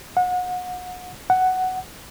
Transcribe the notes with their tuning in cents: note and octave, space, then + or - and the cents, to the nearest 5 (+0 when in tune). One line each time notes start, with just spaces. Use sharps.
F#5 -30
F#5 +10